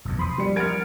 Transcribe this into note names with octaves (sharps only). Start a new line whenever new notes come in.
F1 B1 E2
F3 B5 C6 D#6
G3 C#7
A#4 F#5 F6 G#6 A6 D7